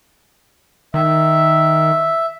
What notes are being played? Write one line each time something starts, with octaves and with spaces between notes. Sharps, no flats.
D#3 E5